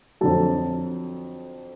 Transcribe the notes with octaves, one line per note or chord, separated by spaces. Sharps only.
F2 D3 F#3 A4 A5